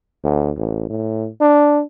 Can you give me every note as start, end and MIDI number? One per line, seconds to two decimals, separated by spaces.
0.23 0.51 38
0.57 0.89 33
0.89 1.28 45
1.41 1.82 62